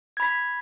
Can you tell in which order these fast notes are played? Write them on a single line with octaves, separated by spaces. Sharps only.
G#6 B5 B6